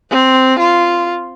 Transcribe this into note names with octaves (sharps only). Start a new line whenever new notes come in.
C4
F4